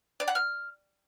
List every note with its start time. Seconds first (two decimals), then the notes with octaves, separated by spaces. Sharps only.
0.20 D5
0.28 F#5
0.35 F6